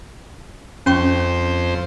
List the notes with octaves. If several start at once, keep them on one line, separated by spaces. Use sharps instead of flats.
F2 C#4 C5 G5 C#6